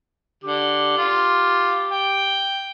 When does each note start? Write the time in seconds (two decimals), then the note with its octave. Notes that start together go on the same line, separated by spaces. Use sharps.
0.44 D3 G4
0.97 F4
1.91 G5